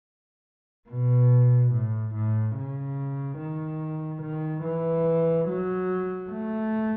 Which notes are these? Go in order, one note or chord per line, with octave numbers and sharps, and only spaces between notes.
B2
A2
A2
C#3
D#3
D#3
E3
F#3
A3